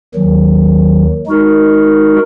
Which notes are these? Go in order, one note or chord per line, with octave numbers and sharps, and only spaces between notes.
D#2 D#3 F#3
G#3 D#4 F#4 A#4